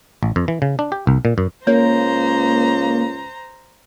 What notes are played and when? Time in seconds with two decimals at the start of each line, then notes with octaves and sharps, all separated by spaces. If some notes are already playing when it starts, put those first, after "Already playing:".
0.23 A1
0.36 F2
0.48 E3
0.62 C#3
0.79 D4
0.92 G4
1.07 C2
1.25 A#2
1.38 F#2
1.67 C#2 A#3 C5 C#5 A#5